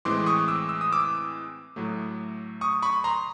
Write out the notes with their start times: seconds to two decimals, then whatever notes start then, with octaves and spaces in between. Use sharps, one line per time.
0.05 A2 E3 G#3 C4 C6 D6
0.26 C#6 D#6
0.48 D6 E6
0.69 E6
0.81 D#6
0.92 D6 E6
1.76 A2 F#3 A3
2.61 C#6 D#6
2.82 B5 C#6
3.04 A#5 C6